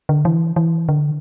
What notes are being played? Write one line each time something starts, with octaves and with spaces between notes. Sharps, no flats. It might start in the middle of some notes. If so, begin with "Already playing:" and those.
D3
E3
E3
D3